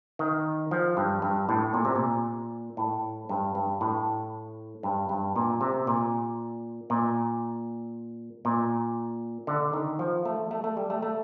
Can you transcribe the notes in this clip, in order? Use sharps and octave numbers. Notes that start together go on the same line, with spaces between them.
D#3
F3
G2
G2
A2
A#2
C3
A#2
A2
G2
G2
A2
G2
G2
A#2
C3
A#2
A#2
A#2
D3
D#3
F3
A3
A3
A3
G3
A3
A3